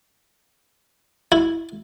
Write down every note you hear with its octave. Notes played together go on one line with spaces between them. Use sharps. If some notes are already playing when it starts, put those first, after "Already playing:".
E4